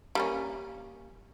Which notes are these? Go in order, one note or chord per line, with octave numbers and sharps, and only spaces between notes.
G3 A#3 C#4